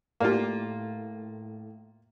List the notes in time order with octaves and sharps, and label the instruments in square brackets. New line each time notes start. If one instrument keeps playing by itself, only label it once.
[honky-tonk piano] A2 [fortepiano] A#3 F4 [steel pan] G4 D5 F5